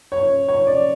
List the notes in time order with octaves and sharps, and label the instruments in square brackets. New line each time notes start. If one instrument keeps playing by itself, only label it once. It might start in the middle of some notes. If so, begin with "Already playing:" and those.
[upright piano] C#5
C#5
D5